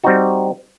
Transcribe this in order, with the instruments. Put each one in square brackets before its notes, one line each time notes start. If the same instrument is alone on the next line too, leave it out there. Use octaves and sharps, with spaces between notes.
[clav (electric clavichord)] G3 C4 D#4 F#4